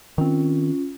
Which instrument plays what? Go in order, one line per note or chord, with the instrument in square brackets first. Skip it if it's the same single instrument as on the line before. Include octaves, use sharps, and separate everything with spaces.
[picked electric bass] D#3 C4 [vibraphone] C#4 F4